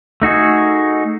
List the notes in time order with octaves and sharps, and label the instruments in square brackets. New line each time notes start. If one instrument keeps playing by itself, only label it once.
[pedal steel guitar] A3 D#4 F#4 G#4